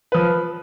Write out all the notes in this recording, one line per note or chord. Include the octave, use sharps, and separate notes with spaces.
F3 B4